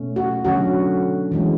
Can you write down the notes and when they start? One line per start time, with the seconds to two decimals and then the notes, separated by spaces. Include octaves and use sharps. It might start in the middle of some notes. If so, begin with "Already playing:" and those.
Already playing: B2 A3 C#4
0.16 F#4
0.45 D3 F#3 C#4 F#4
1.32 E3 G#3 C#4